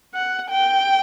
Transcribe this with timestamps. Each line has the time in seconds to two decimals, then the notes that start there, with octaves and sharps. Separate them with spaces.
0.14 F#5
0.50 G5